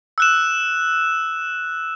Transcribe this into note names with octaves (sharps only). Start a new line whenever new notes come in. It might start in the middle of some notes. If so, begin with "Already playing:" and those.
E6 F#6 E7